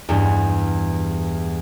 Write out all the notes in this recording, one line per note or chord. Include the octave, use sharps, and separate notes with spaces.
E2 G2